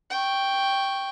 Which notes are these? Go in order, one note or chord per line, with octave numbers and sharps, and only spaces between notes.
G5 C#6